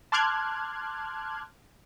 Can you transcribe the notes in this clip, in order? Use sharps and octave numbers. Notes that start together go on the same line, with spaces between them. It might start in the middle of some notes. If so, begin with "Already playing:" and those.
A5 C6 D6 F6 F#6 G#6